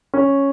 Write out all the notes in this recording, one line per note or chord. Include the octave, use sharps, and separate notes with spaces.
C#4